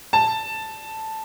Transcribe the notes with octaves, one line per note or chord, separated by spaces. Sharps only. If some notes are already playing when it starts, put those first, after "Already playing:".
A5